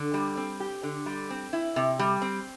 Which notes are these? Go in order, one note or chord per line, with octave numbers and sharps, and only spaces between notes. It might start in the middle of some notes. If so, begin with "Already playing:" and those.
Already playing: D3
G3
C4
G4
D3
G3
C4
E4
C3
G3
C4